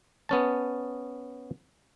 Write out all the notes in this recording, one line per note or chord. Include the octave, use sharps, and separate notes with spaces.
B3 C#4 A5